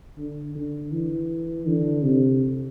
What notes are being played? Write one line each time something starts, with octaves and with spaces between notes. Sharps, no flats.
D3
D3
E3
D3
C3